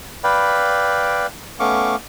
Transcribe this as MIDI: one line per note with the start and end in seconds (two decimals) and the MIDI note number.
0.24 1.27 71
0.24 1.27 74
0.24 1.27 77
0.24 1.27 79
0.24 1.27 83
1.60 1.96 57
1.60 1.96 59
1.60 1.96 61
1.60 1.96 77
1.60 1.96 85
1.60 1.96 86